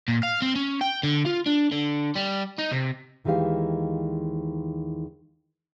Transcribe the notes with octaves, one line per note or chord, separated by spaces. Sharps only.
A#2
F5
C4
C#4
G5
D3
F4
D4
D3
G3
D#4
C3
D#2 D#3 E3 G#3 G4 F5